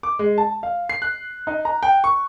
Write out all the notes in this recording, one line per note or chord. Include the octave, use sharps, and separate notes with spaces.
D6
G#3
A5
F5
C7
F#6
D#4
A#5
G5
C#6